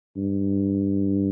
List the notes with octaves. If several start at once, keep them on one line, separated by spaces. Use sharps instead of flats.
G2